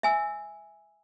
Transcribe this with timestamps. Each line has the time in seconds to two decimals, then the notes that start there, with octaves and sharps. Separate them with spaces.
0.03 E5 G#5 E6